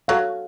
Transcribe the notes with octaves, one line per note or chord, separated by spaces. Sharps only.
F#3 F#4 A4 C#5 F5